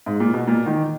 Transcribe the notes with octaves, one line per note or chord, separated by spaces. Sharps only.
G#2
A#2
B2
A#2
D#3